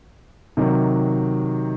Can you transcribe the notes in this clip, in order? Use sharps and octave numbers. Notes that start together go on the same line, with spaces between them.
C3 D#3 F#3